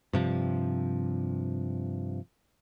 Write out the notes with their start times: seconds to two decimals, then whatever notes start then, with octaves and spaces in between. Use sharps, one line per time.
0.13 G2 C3 F3